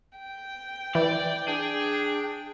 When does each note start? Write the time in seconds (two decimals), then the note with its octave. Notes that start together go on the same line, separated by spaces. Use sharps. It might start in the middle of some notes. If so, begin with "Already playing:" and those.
0.18 G5
0.95 E3 D5
1.48 D4 G#4